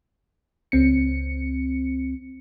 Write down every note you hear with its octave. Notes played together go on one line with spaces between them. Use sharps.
C#2 C4 C#7